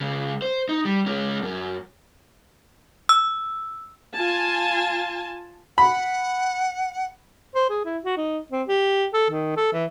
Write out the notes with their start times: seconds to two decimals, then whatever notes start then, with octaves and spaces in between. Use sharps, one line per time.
0.01 C#2 C#3
0.42 C5
0.69 D#4
0.85 G3
1.06 G#3 C#4
1.42 F#2 F#3
3.09 E6
4.15 F4 G#5 A5
5.78 F#5 B5
7.55 C5
7.70 G#4
7.85 E4
8.04 F#4
8.17 D#4
8.52 C4
8.68 G4
9.14 A4
9.30 D#3
9.56 A4
9.73 E3